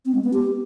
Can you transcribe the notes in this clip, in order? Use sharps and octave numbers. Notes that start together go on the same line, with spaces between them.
C4
G#3
B3
G4